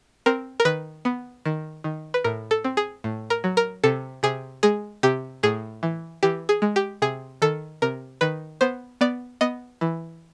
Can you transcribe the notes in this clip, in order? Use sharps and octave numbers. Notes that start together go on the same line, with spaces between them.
C4 A#4
A#4
D#3 B4
B3
D#3
D#3
B4
A2 A#4
A4
C4
G#4
A2
A#4
F#3
A#4
C3 A4
C3 G#4
G#3 G#4
C3 G4
A2 G#4
E3
E3 G4
G#4
G#3
G4
C3 G#4
D#3 A4
C3 A#4
D#3 B4
B3 C5
B3 D5
B3 D#5
E3